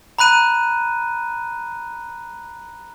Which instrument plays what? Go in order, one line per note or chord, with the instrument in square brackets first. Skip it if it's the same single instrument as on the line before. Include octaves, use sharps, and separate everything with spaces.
[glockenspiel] A#5 B5 F#6 D#7